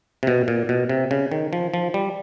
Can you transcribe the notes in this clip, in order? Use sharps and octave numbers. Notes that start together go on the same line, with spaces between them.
C3
B2
A#2
B2
C3
C#3
D#3
F3
F3
G3